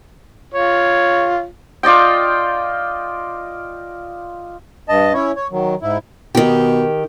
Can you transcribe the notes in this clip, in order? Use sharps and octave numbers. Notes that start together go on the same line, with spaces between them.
F4 C#5
F4 D5 D#5 G5
G2 D#5 A5
C#4 E4 C#5
C#5
D#3 F#3
G#2 E4
B2 D#3 G4